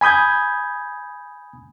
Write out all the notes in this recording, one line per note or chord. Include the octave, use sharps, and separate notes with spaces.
G#5 B5 D#6 G6 G#6